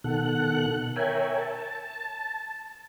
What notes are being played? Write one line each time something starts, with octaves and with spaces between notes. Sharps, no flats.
B2 D#3 A4 F#5 F#6
A#4 C#5 E5 G5 G#5
A5